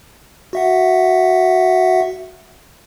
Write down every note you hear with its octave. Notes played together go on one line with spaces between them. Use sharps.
F#4 E5 F#5